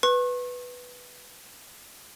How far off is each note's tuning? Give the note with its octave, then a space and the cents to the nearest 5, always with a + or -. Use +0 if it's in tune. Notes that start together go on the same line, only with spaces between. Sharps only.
B4 +0 C#6 -40